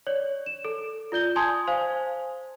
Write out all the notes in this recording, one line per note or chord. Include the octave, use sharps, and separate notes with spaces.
C#5 D5
E7
A4
F4 D5 G6 G7
G#5 A5 C6 D#6 G#6
C5 F5 G#5